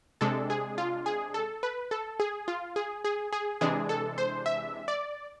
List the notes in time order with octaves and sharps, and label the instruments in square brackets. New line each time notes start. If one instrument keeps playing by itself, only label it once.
[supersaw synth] C3 G#3 D4 A4
G#4
F4
G#4
A4
B4
A4
G#4
F4
G#4
G#4
G#4
C3 E3 G#3 D4 G#4
A4
C5
E5
D5